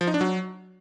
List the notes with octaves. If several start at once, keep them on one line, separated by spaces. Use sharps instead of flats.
F3
D#4
D4
F#3